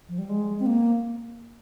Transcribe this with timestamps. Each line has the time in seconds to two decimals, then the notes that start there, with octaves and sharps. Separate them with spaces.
0.09 F3
0.18 G3
0.29 G#3
0.59 C4
0.66 A#3